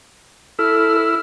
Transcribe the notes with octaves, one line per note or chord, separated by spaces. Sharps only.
E4 A4 F6